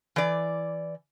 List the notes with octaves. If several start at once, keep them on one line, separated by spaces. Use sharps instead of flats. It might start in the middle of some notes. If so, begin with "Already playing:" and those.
E3 D5